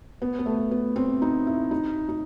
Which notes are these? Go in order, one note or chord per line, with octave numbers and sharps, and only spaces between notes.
B3
B3
A3
B3
C4
D#4
E4
D#4
D#4